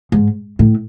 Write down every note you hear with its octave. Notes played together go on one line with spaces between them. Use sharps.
G#2
A2